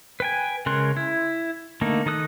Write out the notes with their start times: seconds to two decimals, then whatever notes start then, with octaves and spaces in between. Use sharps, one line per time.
0.20 B4 G5 G#5
0.66 C#3 G#3 A#4 C6 F#6
0.96 E4
1.81 D3 A3 A#3 D#4
2.06 D#3 D#4 A4 D#6 F#6